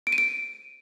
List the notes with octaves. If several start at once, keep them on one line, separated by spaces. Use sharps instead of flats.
D7
D#7
D7